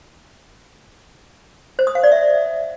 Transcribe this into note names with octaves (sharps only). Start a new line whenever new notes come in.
C5
D#6
F5
D5
E5